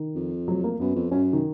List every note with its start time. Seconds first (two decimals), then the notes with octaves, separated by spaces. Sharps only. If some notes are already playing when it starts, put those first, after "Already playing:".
Already playing: D#3
0.15 F2
0.48 F#3
0.64 A#3
0.80 F#2 B3
0.95 F2
1.11 F#2 C#4
1.33 D#3